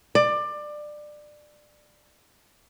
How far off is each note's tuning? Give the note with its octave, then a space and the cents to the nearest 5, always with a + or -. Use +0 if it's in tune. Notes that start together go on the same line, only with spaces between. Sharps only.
D5 +20